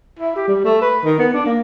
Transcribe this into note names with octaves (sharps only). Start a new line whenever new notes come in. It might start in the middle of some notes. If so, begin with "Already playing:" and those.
E4
G4
G3
A3
B4
D#3
B3
D4
A#3